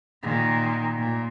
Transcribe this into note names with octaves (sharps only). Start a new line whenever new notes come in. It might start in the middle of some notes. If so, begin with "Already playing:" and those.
A#2 D#3
A#2